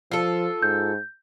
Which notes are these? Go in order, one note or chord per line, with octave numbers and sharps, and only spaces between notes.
F3 F4 A4
G#2 G6